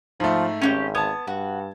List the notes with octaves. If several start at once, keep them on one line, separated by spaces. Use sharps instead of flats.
G#2 F3 A3
G#1 C#4 F#4 G4
B3 A5 G#6
G2 F#4